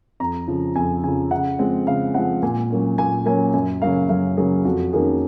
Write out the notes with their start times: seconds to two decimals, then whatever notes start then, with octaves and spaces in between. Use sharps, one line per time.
0.20 F2 A#5
0.48 C#3 F3
0.75 F2 G#5
1.04 C#3 F3 G#5
1.31 C#3 F#5
1.59 F3 G#3 C4
1.87 C#3 F5
2.14 F3 G#3 C4 F#5
2.43 A#2 G#5
2.70 F#3 A#3 C#4
2.98 A#2 G#5
3.26 F#3 A#3 C#4 G#5
3.54 F#2 G#5
3.82 C#3 F#3 A#3 F5
4.09 F#2 F5
4.37 C#3 F#3 A#3 G#4
4.65 F2 F#4
4.93 D#3 A#3 C#4 G#4